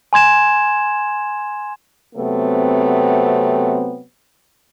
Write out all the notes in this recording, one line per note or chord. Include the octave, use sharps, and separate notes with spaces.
G#5 C6 G#6 E7
C3 F#3 A3 B3 C4